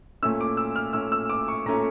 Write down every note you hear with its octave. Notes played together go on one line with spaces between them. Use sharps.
A#2 A3 C#4 E6
D6
E6
F6
A#2 A3 C#4 E6
E6
D6
C#6
A#2 A3 C#4 A#5